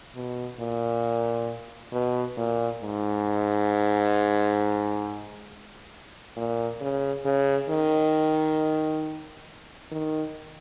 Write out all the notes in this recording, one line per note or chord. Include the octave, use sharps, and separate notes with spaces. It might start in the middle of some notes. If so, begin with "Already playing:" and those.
B2
A#2
B2
A#2
G#2
A#2
C#3
C#3
D#3
D#3